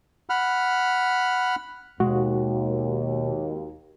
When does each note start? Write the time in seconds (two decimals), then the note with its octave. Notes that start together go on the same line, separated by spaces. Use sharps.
0.30 F#5 B5 F6
2.00 D#2 B2 G#3 F#4